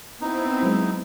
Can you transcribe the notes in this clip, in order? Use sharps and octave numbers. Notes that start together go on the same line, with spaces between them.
B3 C4 D#4 E4
F#3 G#3